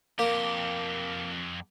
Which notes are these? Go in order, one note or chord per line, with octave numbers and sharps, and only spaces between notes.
F2 A#3 G4